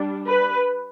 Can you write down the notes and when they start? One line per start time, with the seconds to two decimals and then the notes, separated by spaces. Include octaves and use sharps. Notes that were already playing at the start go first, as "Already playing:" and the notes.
Already playing: G3 D4
0.27 B4